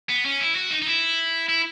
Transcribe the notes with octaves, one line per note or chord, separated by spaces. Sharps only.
B3
C#4
E4
F#4
D#4
D#4
E4
E4